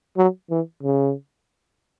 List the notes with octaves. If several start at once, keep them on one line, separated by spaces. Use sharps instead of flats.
F#3
E3
C#3